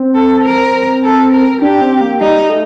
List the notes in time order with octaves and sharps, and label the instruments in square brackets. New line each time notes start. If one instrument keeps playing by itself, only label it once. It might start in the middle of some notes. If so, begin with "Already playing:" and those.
Already playing: [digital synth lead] C4
[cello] A4
A#4
A4
A#4
[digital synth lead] D4 [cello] G4
[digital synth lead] C4
A#3
[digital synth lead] G3 [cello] D#4
[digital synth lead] A3